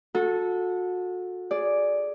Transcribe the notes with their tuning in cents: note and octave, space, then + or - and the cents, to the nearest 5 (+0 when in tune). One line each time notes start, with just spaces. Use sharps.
F#4 -30 A4 +0
G#4 +0 D5 +0